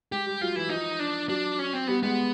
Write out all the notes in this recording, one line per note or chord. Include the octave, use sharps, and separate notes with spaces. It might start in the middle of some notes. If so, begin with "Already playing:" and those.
G#3 G4
G3
F#3 F4
E3 E4
F3 D#4
D4
F#3 D4
C#4
C4
G3 B3
G#3 B3